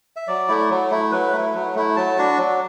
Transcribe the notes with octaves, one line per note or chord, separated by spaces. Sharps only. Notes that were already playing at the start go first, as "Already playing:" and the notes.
E5
F#3 D5
A3 E4
F#3
A3 E4
F#3 B4
A3 E4
F#3
A3 E4
F#3 A5
D4 F#4
F#3